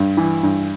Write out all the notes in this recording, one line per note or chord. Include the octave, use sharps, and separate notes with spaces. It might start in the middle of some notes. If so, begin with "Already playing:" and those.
Already playing: G2
E3
G2